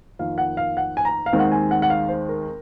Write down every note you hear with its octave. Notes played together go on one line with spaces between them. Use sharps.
F2 D#3 A#3 F5
F#5
F5
F#5
G#5
A#5
F5
D#2 D#3 G#3 C4
F#5
G#5
F#5
F#5
F5
C5
A#4